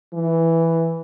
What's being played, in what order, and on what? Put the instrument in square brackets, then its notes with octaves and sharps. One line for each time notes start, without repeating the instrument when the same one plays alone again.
[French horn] E3